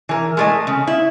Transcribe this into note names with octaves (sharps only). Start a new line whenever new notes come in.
E3 A#4
G#3 A3 D#5
C#3
E4